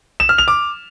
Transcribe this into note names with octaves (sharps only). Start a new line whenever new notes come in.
E7
F6
F7
D6